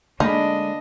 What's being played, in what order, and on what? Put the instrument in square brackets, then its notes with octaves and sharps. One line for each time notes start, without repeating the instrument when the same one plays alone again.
[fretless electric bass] D3 G#3 [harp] A#3 B5 [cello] D4 D#5 [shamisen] D#4